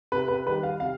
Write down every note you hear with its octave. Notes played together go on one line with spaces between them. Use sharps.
C3 B4
B4
D#3 G3 B4
F5
C3 F5